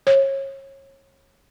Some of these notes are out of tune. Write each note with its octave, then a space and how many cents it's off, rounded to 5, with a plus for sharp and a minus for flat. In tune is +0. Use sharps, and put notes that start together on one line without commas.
C#5 -30